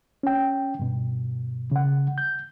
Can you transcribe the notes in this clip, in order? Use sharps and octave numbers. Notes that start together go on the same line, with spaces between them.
C#4 G5
G2 B2
C#3 F#5
G6